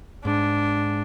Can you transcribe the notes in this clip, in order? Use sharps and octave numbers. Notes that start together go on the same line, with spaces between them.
G#2 D4